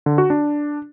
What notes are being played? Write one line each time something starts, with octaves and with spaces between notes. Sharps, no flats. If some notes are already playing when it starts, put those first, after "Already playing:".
D3
F#4
D4